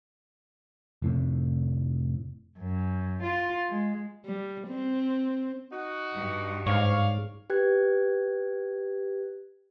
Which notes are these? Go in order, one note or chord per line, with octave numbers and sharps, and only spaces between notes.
F1 A2 C3
F#2
F4
G#3
G3
C4
D#4 F#4
G2
G#2 C#5 D5 F5
G4 B4 G5 F#6 G#6